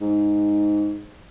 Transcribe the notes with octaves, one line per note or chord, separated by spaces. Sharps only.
G#2